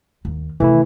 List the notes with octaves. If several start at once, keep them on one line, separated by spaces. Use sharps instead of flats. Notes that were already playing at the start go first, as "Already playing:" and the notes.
D#2
C3 D#3 E3 A3 E4